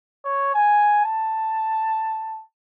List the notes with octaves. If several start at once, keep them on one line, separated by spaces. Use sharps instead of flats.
C#5
G#5
A5